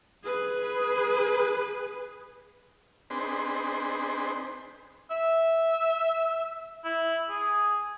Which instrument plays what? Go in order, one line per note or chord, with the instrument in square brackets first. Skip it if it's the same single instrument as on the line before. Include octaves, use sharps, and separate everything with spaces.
[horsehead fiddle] G#4 B4
[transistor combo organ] C4 D4 D#4 G#4 B4 C5
[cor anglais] E5
E4
G#4